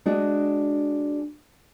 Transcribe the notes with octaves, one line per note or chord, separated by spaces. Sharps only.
G#3 D4 F#4 D#5